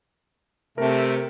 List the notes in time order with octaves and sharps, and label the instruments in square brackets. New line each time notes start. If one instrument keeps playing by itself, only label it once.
[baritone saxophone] C3 [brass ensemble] A3 [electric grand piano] A#4